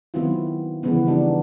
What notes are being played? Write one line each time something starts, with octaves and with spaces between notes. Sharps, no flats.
D#3 F#3 B3 C4 E4 F4
C#3 E3 F3 G3 B3 C#4
B3 C4 D4 D#4 G4